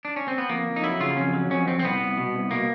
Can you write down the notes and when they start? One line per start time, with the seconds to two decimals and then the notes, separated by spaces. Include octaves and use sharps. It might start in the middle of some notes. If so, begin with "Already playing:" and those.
0.05 D4
0.16 C#4
0.28 C4
0.38 B3
0.49 F2 A#3
0.67 F2
0.76 D#4
0.83 F#3 E4
1.00 C#3 F4
1.16 F2 C#4
1.34 F#3
1.50 F2 C#4
1.67 F2 C4
1.79 C4
1.84 C2 B3
2.02 C2
2.18 B2
2.35 C2
2.51 B2 A#3